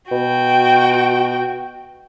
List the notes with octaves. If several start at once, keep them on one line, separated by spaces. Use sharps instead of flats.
B2 F#4 G5